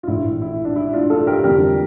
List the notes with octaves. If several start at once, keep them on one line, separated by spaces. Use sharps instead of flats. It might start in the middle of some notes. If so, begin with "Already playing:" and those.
F4
A#1 A2 E3 E4
E4
D4
E4
D4 F4
F4 A4
G4 A#4
F2 D3 G3 C4 G4 A#4